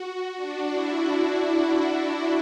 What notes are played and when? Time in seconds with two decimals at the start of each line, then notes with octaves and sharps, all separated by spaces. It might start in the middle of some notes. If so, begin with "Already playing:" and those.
Already playing: F#4
0.36 D4
0.71 E4